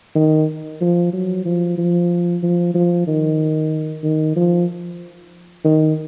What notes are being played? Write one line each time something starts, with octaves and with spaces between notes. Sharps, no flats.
D#3
F3
F#3
F3
F3
F3
F3
D#3
D#3
F3
D#3